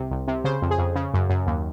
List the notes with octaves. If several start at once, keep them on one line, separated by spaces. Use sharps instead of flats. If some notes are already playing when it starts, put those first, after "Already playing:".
Already playing: C2 C3
C2
C3
C#3 C5
F2
G#4
F2
C#3
F#2
F#2
D#2